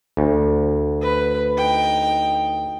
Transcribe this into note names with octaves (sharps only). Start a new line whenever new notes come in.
D2
B4
D#4 G5